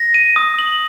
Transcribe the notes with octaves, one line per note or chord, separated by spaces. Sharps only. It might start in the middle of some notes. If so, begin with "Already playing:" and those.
Already playing: A#6
D#7
D#6
F#7